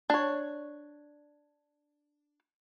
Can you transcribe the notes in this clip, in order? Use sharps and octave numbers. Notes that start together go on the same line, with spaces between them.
D4 C#5